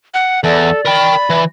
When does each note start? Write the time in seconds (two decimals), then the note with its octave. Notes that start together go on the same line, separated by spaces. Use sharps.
0.14 F#5
0.44 E2 A4 D5
0.85 A#4 G5 B5
1.30 E3